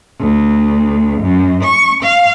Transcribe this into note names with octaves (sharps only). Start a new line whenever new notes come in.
D2
F#2
C#6
F5